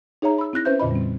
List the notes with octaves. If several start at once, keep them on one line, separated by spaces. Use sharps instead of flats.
D#4 G#4 C#5 E5 A#5
B5 E6
C4 E4 F#6 A#6
C#4 B4 C5 E5 G6
F2 A#2 D3 F4 D#5 B5
G3 C4